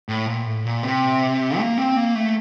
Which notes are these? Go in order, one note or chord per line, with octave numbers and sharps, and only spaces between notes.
A2
A#2
A2
A#2
C3
A#3
C4
A#3
A3